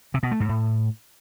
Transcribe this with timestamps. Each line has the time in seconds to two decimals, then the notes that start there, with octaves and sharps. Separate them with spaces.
0.14 C3
0.23 B2
0.32 A3
0.40 G#2
0.49 A2